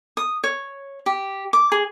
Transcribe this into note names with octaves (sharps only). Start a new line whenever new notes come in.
D#6
C#5
G4
D6
G#4